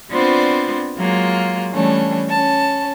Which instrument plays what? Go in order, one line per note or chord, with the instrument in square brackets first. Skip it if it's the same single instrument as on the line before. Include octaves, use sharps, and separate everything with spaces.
[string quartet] B3 C4 D4 F4 C5 D5
F#3 G#3 A#3 F4
E3 G3 A3 C#4 D4
C#4 A5